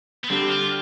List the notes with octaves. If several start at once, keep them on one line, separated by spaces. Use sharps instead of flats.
B3
D3 G3 C4 D4 G4
F4